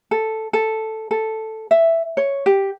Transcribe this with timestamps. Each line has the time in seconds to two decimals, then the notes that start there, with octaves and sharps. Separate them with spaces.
0.11 A4
0.53 A4
1.11 A4
1.71 E5
2.17 C#5
2.46 G4